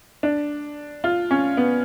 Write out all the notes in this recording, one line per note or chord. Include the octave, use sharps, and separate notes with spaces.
D4
F4
C#4
B3